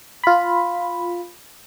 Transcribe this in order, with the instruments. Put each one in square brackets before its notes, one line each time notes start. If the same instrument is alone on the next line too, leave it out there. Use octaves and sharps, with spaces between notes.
[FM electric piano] F4 B5